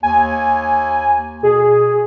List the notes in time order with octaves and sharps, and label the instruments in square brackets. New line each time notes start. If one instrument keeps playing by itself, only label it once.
[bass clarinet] D#2 [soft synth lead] G#5
[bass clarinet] B2 [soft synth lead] G#4